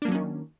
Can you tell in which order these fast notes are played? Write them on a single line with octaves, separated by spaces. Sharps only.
D4 A#3 F#3 C#4 D#3